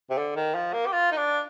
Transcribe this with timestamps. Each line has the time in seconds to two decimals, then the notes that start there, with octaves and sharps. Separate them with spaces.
0.10 C3
0.17 D3
0.36 D#3
0.54 F3
0.73 A#3
0.86 G4
0.93 F4
1.11 D#4
1.17 D4